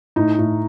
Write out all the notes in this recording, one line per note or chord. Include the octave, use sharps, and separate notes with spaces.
A2 D#4
A2